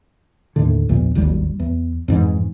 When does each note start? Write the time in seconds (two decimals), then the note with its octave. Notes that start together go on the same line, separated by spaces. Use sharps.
0.56 D#2 A2 D3
0.89 A#1 E2 A#2
1.15 D1 G#1 D#2 G3
1.60 E2
2.08 F2 G#2 E3